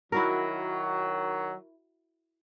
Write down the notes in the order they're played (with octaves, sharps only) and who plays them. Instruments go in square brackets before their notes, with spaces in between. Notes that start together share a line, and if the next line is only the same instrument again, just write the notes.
[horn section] D#3 F#3 [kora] E4 F#4 A#4